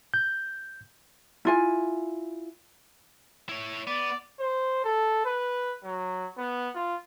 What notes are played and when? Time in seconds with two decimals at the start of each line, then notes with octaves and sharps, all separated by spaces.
0.14 G6
1.45 E4 F4 G#5
3.49 E4 C#5
3.87 B3 D5
4.40 C5
4.84 A4
5.25 B4
5.84 F#3
6.38 B3
6.75 F4